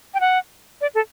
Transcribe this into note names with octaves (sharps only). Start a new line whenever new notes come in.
G5
F#5
D5
A4